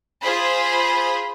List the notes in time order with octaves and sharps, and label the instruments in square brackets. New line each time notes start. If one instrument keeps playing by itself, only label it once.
[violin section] F4 G#4 C5 B5